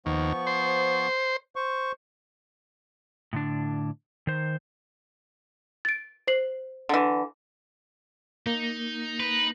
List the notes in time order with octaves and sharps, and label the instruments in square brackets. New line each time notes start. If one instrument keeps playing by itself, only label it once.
[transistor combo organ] D#2 [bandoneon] F3 B3 C#6
[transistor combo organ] C5
[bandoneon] C5 C#6
[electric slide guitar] A2 D3 D4
D#3 C5
[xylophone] A6 D7
C5 C7 F#7
[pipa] D3 E3
[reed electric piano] A#3 [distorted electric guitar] D#4
[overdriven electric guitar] B4